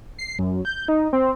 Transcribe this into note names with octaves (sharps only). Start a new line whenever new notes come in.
C7
F#2
G6
D#4
C4